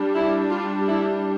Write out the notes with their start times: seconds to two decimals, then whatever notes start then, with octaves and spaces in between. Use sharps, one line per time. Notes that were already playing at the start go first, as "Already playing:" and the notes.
Already playing: G3 D4
0.14 E4
0.50 F4
0.87 E4